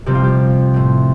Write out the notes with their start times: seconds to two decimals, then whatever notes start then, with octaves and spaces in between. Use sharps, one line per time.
0.06 F2 C3 G3 C4 G4
0.15 F4
0.24 G4
0.74 A2 A3 C4